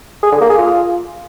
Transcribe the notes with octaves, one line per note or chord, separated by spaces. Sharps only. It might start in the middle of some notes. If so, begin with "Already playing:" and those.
G#4
D3
A#3
G#4
F4